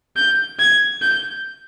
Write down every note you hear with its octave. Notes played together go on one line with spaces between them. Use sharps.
G6
G#6
G6